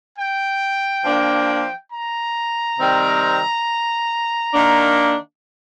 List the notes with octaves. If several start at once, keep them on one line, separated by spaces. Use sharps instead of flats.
G5
F3 A#3 D4
A#5
C3 D#3 G3 C4
D#3 A#3 D4